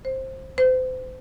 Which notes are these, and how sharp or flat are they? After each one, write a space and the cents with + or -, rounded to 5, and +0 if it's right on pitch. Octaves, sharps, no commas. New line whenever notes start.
C5 +15
C5 -35